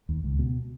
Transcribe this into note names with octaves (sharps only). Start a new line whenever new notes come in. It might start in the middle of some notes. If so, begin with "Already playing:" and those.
D#2
C#2
B2